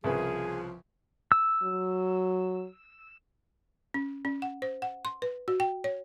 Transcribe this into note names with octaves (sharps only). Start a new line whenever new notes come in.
C2 C#3 F3 G#4 B4
E6
F#3
C#4
C#4
F#5
C5
F#5
C6
B4
F#4
G5
C#5